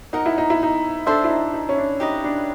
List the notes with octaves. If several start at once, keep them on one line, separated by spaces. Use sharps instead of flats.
D#4 A#4 D#5 F#5
E4
D#4
E4
D#4
D4 A4 C5 E5
E4
D#4
D#4
C#4
D4
D#4 G4 B4 D#5
D4